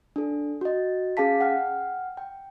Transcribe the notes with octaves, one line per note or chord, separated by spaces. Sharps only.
D4 A4
F#4 D#5
C#4 G#4 F5 A5 B6
F#5 G5 F6
G5